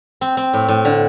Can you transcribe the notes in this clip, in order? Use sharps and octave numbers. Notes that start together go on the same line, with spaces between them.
C4
C4
A2
A2
D3